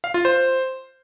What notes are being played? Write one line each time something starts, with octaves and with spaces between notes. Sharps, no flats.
F5
F4
C5